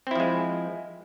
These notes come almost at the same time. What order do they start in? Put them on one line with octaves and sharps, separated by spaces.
C4 E4 F3 G#3